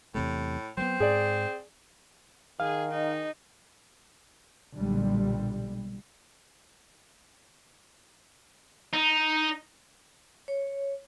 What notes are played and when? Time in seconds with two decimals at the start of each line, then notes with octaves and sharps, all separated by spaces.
0.15 E2 A2 C3 A3
0.77 F#3 G#3 B3 C4
1.00 G#2 G#4 D5
2.60 D#3 G#4 F5
2.91 D#4
4.78 B1 A#2 D3 G3
8.93 D#4
10.48 C#5